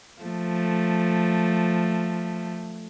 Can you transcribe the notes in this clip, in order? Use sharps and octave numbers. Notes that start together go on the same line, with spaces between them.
F3 A3